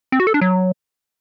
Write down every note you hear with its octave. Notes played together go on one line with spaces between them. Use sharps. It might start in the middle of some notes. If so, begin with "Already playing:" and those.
C4
F#4
A4
D4
F#3